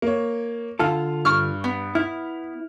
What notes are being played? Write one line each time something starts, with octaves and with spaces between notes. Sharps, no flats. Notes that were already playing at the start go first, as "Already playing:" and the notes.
A#3 C#5
D3 F4 A4 F5 A5 F6
G2 C#6 F6
B3
E4 F6